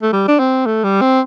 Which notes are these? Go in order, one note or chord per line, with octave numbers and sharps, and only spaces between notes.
A3
G3
D4
C4
A3
G3
C4